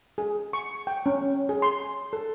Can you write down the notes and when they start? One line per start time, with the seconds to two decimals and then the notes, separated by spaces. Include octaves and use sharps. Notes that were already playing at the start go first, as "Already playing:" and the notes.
0.18 G#4
0.53 C#6
0.87 G5
1.06 C#4
1.49 G#4
1.62 C6
2.13 A4